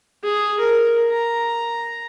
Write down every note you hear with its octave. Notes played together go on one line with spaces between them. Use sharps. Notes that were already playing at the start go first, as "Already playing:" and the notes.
G#4
A#4
A#5